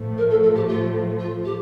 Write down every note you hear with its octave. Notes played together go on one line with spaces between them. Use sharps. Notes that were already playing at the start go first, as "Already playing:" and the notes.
Already playing: A2 F3 A3
A#4
A4
A4
G4
F4
F4
G4